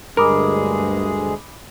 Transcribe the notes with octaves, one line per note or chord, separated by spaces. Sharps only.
D2 G2 G#3 G#4 A#4 B5 D6 D#6